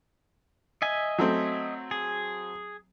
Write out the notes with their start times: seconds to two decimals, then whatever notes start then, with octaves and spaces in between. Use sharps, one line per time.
0.82 D#5 E5 G#5
1.18 F#3 A3 C4
1.91 G#4